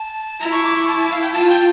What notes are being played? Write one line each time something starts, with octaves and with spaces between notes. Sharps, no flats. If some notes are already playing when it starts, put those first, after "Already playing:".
Already playing: A5
E4 A#5
C#6
D6
C#6
A5
A5
F5
G5
F4 A5
G5